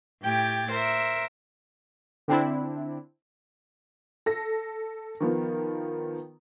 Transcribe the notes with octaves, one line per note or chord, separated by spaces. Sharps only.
A2 G4 G5 G#6 A6
A#4 C5 E5
D3 C4 D4 E4
A4 A#6
D#3 F3 B3